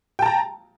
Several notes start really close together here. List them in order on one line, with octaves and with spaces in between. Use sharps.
G5 A5 A#5